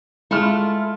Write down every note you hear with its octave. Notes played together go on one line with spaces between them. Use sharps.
G#3 A3 E4 F4 F6